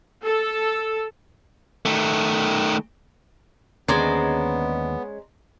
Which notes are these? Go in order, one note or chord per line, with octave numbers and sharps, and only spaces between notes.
A4
D#3 A3
D#2 D3 G#3 B3 C#4 C5 D5 A#5